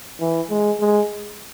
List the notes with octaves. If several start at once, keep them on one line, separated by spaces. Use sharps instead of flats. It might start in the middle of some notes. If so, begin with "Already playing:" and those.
E3
G#3
G#3